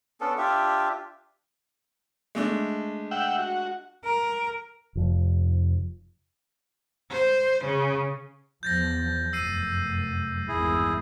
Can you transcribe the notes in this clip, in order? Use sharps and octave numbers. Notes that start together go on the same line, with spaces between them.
B3 C#4 D4 A4
D4 F4 G4 E5
G#3 A3 D4
E5 F#5 G5
F#4
A#4
F1 F3
C5
C#3
E2 F3 G6 A6 A#6
F1 F#2 E6 C7 D#7
G#1 E2 G2 E4 G#4